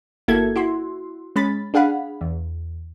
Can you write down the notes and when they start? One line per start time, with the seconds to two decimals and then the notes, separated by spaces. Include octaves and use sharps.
0.28 G1 A#3 E4 F#4 A4 G#6
0.56 E4 F#4 C6
1.36 G#3 C#4 B5 A6
1.74 D4 G#4 F5 F#5 B5
2.21 E2